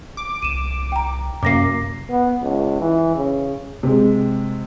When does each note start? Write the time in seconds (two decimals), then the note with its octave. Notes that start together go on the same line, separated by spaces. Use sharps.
0.17 D6
0.43 C2 D#7 E7
0.92 G5 A#5
1.43 F#2 C3 A#3 D6 A#6 C7
2.09 B3
2.42 C#2
2.81 E3
3.16 C#3
3.83 C3 G#3